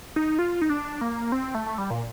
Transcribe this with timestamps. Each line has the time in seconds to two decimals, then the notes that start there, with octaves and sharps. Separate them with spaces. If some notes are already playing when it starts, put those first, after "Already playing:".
0.16 D#4
0.39 F4
0.62 D#4
0.70 D4
1.01 A#3
1.32 C4
1.55 A3
1.66 A3
1.78 G3
1.90 A#2